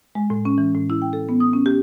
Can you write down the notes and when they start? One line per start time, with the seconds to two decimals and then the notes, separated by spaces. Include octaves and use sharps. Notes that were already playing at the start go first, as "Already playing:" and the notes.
0.15 G#3
0.30 A2
0.45 C#4
0.58 E3
0.75 A2
0.90 E4
1.02 G5
1.13 A4
1.29 B3
1.40 D#6
1.53 C#4
1.66 G4